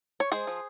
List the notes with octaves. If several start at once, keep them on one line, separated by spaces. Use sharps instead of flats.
C#5
G#3 G#4 C5
F3